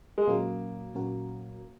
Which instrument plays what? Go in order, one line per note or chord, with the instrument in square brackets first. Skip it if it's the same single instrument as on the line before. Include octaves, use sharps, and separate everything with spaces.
[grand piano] G#3
[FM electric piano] A#2 F#3 C#4 F#4 A#4 [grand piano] A#3
[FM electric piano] A#2 F#3 C#4 F#4 A#4